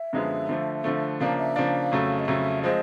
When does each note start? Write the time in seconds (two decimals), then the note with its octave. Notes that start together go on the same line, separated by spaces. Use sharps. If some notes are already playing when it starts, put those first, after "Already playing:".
Already playing: E5
0.13 F#2 D3 F3 G#3 B3
0.49 D3 F3 A3
0.84 D3 F3 A3
1.20 C#3 F3 A#3 D4 F5
1.38 E5
1.55 C#3 F3 A#3 D4 F5
1.92 F2 C#3 F#3 A3
2.19 D#5
2.28 F2 C#3 F#3 A3 E5
2.63 F3 G#3 C4 D#5